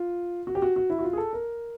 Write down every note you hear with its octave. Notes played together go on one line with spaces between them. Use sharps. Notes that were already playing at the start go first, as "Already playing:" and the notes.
Already playing: F4
F#4
G4
F#4
F#4
E4
F#4
F4
G#4
A4
A#4